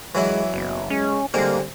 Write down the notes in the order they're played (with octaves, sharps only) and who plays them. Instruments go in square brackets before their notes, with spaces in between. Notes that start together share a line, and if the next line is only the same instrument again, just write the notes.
[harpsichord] E3 F#3 E4 [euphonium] G#3
[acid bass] F#1 [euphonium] B2
[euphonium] G#3 [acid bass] C#4
[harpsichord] D3 G#3 C4 [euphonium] G3 [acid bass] A#3